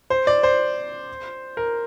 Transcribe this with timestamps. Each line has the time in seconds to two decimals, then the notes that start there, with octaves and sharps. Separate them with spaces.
0.10 C5
0.27 D5
0.43 C5
1.57 A#4